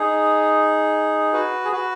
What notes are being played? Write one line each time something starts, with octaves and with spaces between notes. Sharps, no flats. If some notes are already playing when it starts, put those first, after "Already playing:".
Already playing: D#4 G#4
F#4 B4
G#4
F#4 B4